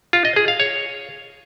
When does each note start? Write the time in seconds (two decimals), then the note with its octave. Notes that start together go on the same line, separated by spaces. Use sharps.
0.13 F4
0.25 D#5
0.36 G#4
0.48 F5
0.60 C#5